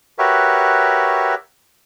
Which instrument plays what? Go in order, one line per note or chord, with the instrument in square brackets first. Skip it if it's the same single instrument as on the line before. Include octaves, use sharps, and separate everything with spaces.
[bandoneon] F#4 G4 A#4 B4 C#5 E5